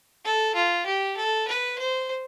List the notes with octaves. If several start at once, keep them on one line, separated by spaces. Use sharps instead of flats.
A4
F4
G4
A4
B4
C5